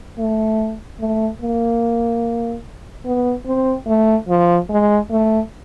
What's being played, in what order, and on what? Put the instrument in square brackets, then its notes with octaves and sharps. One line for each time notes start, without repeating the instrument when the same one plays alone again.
[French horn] A3
A3
A#3
B3
C4
A3
F3
G#3
A3